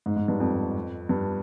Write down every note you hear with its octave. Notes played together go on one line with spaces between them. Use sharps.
G#2
G#2
G2
F2
G2